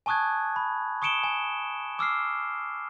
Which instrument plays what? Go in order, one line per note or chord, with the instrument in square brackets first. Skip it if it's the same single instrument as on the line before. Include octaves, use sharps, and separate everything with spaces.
[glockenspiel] G#5 A5 C#6 D#6 F#6 G#6
B5
C#6 D#6 C#7 D7 E7 G7
G#5
D6 E6 F6 C7